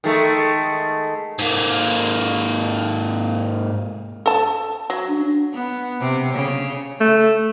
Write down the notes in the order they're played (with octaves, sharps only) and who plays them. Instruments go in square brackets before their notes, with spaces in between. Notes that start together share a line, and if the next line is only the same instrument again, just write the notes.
[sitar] D#3 G#3 A3
[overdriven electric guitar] G#2 A#3
[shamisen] A4 A5
F#3
[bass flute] D4
[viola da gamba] B3
C3
C#3
[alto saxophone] A3